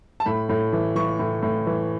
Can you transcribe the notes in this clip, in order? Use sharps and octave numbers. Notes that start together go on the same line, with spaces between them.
A5
A2 B5
A2
E3
E3 C#6
A2
A2
E3